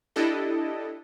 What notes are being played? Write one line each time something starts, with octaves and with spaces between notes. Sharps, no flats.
D4 E4 G4 A4 D#5